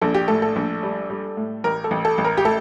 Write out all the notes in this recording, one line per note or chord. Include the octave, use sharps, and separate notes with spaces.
A#1 A4
G4
A2 A4
A4
A#1
G3
G3
A2
A1 A#4
A4
A1
A4
A1
A#4
G4
A3 A4